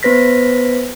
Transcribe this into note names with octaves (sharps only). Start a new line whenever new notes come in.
B3 B4 C5 A#6 B6